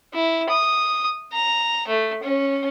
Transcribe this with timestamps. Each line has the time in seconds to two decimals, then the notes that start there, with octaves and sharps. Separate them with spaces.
0.14 E4
0.49 D#6
1.32 A#5
1.88 A3
2.23 C#4